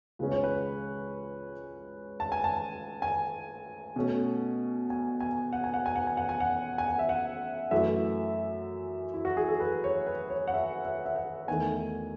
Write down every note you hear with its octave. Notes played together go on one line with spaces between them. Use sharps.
C#2 C#3 G#3 C#4 B4
C#5
B4
A5
G#5
A5
G#5
B2 A3 C#4
G#5
G#5
F#5
G#5
F#5
G#5
F#5
G#5
F#5
G#5
F#5
G#5
F#5
E5
F#5
F#2 E3 A3 E5
E4
F#4
G#4
A4
B4
C#5
B4
C#5
F#5
E5
E5
E5
F#5
E2 D#3 A3 G#5